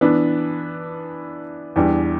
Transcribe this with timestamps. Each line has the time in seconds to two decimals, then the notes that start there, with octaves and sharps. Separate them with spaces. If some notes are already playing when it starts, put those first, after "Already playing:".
0.01 E3 B3 D4
1.76 E2 E3 G3 D4